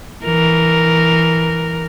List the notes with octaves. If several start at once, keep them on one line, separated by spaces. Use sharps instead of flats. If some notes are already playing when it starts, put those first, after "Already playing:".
E3 A#4